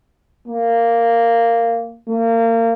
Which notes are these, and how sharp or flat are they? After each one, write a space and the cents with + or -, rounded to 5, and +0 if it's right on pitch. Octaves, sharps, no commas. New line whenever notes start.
A#3 -10
A#3 -30